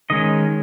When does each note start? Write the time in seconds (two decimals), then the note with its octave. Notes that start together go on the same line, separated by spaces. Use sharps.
0.10 D#3 G#3 C#4 D#5